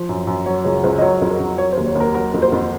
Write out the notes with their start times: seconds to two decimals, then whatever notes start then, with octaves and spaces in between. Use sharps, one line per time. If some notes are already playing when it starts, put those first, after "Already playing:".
Already playing: F3
0.09 F#2
0.27 F#2
0.46 F#3 C#5
0.64 C#2 C#5
0.83 C#2 C5
0.98 D#5
1.02 F#3 C#5
1.21 F2
1.30 A#4
1.40 F2
1.58 F#3 C#5
1.72 C5
1.77 D#2
1.86 C#5
1.95 D#2 A#4
2.15 F#3 A#4
2.34 F2
2.42 C5
2.52 F2